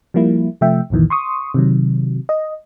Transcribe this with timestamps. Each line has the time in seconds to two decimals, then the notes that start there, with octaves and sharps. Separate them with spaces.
0.14 F3 G3 A#3 E4
0.61 C3 F3 A3 E5 G5
0.90 C2 F2 A#2 D#3 E3
1.10 C6 C#6 D#6
1.54 C3 D#3 F#3
2.29 D#5